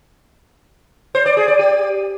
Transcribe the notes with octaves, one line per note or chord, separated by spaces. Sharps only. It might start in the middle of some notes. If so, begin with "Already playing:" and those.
C5
D5
G#4
D5
G4